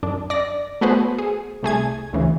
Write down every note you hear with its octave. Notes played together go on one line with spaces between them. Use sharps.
F#2 D4
D5 A#6
A3 B3 F#4 G#4 B4 C5
G#4
C2 A3 G#4 G#6
D2 C#3 E3